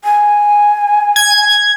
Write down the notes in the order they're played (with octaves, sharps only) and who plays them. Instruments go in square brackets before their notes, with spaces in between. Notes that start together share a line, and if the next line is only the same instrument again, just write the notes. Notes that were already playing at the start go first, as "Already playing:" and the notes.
[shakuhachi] G#5
[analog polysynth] G#6